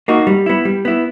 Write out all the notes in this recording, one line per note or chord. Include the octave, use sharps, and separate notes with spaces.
A#3 D#4 F#4
G3
B3 E4
G3
B3 E4